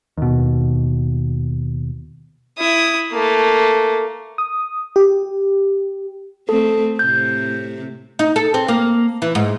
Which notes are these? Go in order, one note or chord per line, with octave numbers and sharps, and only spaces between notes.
D#2 B2
E4 D#6
A3 A#3
D#6
G4
A3 C4 A4
A2 C3 G6
D#4
A4
C4
A#3
E3
G#2